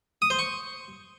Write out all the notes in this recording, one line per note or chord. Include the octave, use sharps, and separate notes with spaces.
D#6
C5
C#6